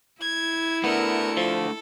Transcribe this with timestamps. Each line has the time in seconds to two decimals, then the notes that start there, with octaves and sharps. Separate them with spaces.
0.21 E4 G#6
0.84 A3 B3 D4 A#4 C#7
1.37 F3 A4